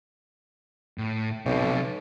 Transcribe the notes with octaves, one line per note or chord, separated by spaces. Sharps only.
A2
B1 C3 A4